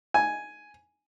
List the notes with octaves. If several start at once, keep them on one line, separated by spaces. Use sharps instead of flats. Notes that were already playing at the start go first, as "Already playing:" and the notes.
G#5